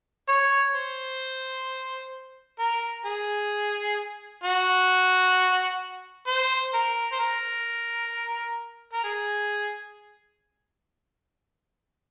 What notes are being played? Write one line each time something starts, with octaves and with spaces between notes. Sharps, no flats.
C#5
C5
A#4
G#4
F#4
C5
A#4
C5
A#4
A#4
G#4